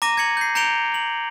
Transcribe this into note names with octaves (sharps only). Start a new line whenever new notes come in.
A#5 D6 A#6 D#7
G#6 A#6 C#7 F#7
G6 C7
A#5 G6 C#7 D7 F7 G7
F#7